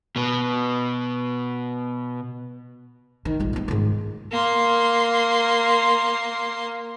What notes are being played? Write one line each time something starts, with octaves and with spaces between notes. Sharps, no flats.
B2 B3
D#3
A#1 G3
B3 C4
G#2 D#3
A#3 C6